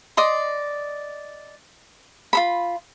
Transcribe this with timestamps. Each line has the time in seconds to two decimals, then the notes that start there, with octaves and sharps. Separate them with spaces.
0.17 D5 D#5 C6
2.33 F4 A4 B5